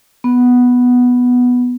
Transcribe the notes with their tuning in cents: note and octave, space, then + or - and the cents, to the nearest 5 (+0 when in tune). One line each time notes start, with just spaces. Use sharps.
B3 +0